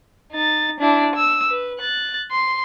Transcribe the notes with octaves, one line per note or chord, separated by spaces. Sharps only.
D#4 A6
D4 E4
E6
B4
F#6 A6
C6